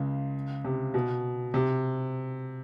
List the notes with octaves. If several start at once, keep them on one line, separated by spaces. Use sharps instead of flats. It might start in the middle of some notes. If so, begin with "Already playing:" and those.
Already playing: C#2 C#3
C3
B2
C3